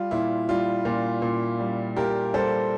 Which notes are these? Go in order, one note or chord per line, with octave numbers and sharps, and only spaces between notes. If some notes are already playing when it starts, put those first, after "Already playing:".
Already playing: G3 F4
A#2 E4
G3 F4
A#2
A#2
G3
A#2 G4 A#4
G3 A4 C5